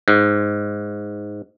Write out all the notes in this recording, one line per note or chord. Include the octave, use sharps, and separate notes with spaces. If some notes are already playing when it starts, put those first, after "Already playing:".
G#2